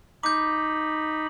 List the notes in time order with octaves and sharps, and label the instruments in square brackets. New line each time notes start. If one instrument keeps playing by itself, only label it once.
[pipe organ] D#4 B5 [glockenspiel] D6 G6